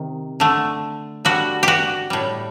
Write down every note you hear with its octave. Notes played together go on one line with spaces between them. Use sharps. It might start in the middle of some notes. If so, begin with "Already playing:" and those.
Already playing: C3 D#3
D3 A3
D3 G3 F#4
F#4 G4
A2 G3